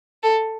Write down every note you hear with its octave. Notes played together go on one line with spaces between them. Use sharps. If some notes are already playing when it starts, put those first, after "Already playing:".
A4